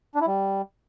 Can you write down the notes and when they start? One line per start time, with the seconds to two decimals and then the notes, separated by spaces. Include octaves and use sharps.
0.15 D4
0.21 E4
0.27 G3